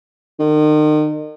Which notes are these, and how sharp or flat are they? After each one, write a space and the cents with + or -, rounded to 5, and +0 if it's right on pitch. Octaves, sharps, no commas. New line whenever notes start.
D#3 -35